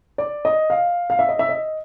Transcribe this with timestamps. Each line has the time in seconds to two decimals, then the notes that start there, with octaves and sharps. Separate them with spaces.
0.18 D5
0.45 D#5
0.70 F5
1.10 F5
1.19 E5
1.29 D#5
1.39 E5
1.49 D#5